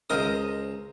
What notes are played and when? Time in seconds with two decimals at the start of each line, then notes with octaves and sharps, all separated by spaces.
0.10 C#2 A#4 C5 D#5 D#6